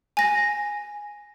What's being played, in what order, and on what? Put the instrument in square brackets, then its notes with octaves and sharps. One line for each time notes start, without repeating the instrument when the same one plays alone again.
[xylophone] G#5 A#6